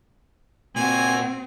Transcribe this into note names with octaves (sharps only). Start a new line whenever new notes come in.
A#2 C4 F#4 G#5